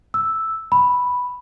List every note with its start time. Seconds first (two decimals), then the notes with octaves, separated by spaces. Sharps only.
0.14 E6
0.72 B5